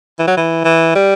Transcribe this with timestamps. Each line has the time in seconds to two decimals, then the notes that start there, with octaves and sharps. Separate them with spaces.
0.19 E3
0.27 F#3
0.37 E3
0.64 E3
0.95 G3